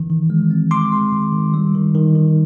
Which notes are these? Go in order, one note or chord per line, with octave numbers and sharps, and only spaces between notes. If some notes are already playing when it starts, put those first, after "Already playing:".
Already playing: D#3 E3
D#3
G#3
C4
G#3 C6 D6
G#3
D#3
D#3
G3
D#3
D#3
D#3